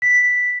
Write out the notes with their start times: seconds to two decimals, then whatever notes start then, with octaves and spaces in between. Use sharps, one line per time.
0.02 B6